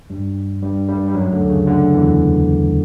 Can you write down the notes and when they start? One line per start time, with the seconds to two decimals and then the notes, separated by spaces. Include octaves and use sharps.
0.10 G2 G3
0.62 G2 G3
0.88 G2 G3
1.08 G3
1.14 F#2 F#3
1.33 D2 D3
1.49 C#3
1.67 D2 D3
1.93 E2 E3